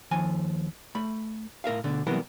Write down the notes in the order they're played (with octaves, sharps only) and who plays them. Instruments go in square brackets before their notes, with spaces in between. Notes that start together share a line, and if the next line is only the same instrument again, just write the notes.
[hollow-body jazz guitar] D#2 F3 G#5
A3 B5
A2 A#4 E5 F5
D2 B2 D3
C3 E3 F#3 G3 B3 A#4